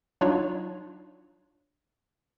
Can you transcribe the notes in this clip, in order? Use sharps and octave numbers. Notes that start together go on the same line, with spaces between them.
F#3 D4 D#4 F4 C#5